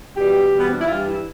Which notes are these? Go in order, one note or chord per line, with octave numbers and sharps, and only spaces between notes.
E2 B2 G3 G4
E2 B2 G3
B3
C4
D4
E4
G2 E3 G3 F4
E4